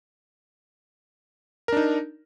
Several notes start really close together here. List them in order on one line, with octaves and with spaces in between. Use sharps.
A#4 D4 D#4